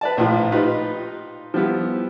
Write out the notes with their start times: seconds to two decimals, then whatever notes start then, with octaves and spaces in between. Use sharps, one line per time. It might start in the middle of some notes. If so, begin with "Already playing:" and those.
0.01 B4 D5 A5
0.17 A#1 A2 F4 F5
0.52 D#4 F4 G4 B4
1.54 F3 G3 B3 E4